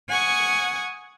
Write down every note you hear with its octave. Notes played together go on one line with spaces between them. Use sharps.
F#5 G#5 C#6 D#6